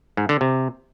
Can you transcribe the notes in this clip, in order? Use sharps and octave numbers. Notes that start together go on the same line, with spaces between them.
G#2
D3
C3